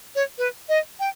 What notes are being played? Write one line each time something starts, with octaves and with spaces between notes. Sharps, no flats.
C#5
B4
D#5
G5